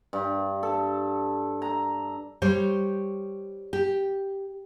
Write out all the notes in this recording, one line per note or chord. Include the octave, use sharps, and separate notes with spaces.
G2
A4
A#5
G3 C5 C#5
G4